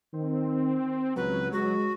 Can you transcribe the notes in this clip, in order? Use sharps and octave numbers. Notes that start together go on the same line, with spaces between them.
D#3 C4
C#2 F#3 B4
G#3 F#4